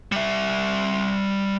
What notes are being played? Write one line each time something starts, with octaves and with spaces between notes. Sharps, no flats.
G3 E5